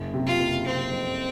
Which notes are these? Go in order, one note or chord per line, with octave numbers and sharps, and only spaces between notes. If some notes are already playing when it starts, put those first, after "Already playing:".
Already playing: F#1
C3
F4
F#1
C3 C4
F2